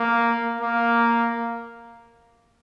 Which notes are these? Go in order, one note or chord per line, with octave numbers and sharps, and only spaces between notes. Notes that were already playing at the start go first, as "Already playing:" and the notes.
Already playing: A#3
A#3